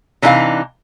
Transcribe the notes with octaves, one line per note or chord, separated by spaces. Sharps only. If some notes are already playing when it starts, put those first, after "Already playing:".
C3 E3 D4 D#4 G4 F5